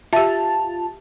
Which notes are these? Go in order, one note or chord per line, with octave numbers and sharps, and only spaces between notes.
F4 G4 E5 A5